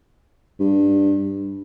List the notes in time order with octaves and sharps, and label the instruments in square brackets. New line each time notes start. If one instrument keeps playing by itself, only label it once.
[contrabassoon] G2